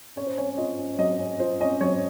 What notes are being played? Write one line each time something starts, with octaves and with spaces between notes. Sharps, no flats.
C#4 C#5
C5
C#4 C#5
F4 D#5
C#4
F#3 D#5
C#4
F4 C5
C#4 D#5
F#3 C#5